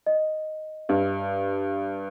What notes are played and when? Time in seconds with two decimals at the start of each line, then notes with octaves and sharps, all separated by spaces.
0.06 D#5
0.89 G2